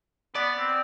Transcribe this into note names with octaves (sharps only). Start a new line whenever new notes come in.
B3 D5
C4